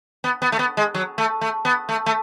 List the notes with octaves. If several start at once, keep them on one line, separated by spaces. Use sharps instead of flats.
B3
B3
A3
B3
G#3
F#3
A3
A3
B3
A3
A3